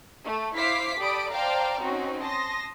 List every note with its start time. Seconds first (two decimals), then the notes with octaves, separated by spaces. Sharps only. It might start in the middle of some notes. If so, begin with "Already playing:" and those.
0.23 A3
0.56 E4 C5 F5 D6 B6 C7
1.00 G4 A4 D5 B5 D#6 D7
1.31 C5 D5 F5 G5 A5 A#5
1.81 C4 C#4 D#4 F#4
2.21 A5 C6 D#6 A#6